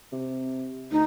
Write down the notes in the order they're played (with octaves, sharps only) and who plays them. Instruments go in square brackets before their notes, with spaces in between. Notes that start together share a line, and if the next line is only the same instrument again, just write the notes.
[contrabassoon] C3
[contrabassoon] D2 [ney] D#4